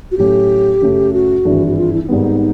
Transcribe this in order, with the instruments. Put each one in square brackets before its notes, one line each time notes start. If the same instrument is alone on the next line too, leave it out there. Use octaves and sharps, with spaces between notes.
[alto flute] F#4
[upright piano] A2 F#3 A3 C#4 [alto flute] G4
[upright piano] F#2 C#3 F#3 A3
[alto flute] F#4
[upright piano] G#1 G2 E3 G#3
[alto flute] F#4
F4
E4
E4
[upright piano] G#1 G#2 D#3 G3 B3 [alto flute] D#4